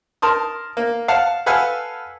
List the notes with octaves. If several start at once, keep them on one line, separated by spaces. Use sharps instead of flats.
A#4 A5 C6 D#6
A#3
F5 F#5 A5 F6
A4 B4 F5 F#5 G#5 E6